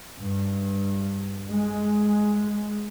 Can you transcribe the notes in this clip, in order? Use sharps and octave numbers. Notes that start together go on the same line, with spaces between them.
G2
G#3